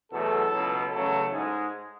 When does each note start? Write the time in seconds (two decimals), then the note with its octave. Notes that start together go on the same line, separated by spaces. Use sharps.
0.11 E2 B2 F#3 A3 A4
0.52 C#2 B2 F#3
0.91 E2 C#3 F#3 A3 A4
1.32 G#2 G#3 G#4